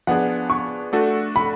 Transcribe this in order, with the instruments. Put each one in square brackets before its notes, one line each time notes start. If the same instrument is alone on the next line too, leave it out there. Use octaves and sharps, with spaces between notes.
[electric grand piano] F3 B3 D4 G#4 [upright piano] F#5
[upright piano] C#6
[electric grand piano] A3 D4 F#4 A4
[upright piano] B5